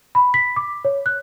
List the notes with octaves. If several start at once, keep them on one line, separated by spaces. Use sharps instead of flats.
B5
B6
D6
C#5
F#6